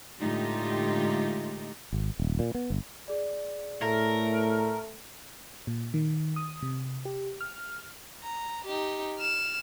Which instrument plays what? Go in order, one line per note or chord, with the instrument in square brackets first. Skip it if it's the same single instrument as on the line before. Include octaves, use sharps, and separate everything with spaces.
[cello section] A2 D3 G#3 D#4 F4 G4
[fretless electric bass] G#1
D#1
A#2
B3
G1
[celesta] G#4 D5
[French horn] A2 [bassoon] A3 [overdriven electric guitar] A#4
[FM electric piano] A#2
D#3
D#6
C3
G4
F6
[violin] A#5
D#4 G4
F6 E7